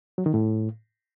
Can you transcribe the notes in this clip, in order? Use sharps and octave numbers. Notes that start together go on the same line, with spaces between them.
F#3
D#3
A2